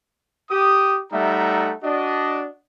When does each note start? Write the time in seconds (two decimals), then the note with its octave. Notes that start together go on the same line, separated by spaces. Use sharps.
0.50 G4 D#6
1.12 G3 A3 D#4 E5 F#5 A#5
1.83 D4 F#4 D#5